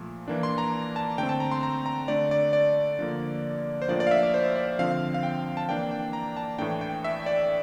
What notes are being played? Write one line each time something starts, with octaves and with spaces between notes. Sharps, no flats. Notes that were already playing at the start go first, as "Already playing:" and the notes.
Already playing: A#2 F3 A3
E3 A#3 D4
C6
A#5
A5
D3 A3 C4 G5
A5
A#5
C6
A#5
A#5
D3 A3 D4 D5
D5
D5
D3 F3 A#3
C5
A2 F3 A#3 D4 D5
D5
F5
E5
D5
C5
D5
D3 F3 C4 F5
F5
G5
A5
E3 A#3 D4 G5
G5
A#5
A5
A2 E3 A3 D4 G5
G5
E5
D5